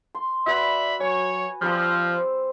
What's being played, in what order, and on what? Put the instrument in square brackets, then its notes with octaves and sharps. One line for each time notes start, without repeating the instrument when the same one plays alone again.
[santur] C6
[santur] F#4 B4 [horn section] D5 E5 B5
[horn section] F#3 C#5 [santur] G#5
[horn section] F3 [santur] G3 C4 E6